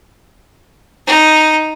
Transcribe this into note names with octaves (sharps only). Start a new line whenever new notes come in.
D#4